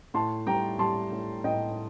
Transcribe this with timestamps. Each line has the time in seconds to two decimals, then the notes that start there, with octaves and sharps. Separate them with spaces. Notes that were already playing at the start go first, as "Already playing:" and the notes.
0.14 A2 A5 C6
0.46 G3 G5 A#5
0.79 G3 A5 C6
1.12 A2
1.44 A2 D#5 G5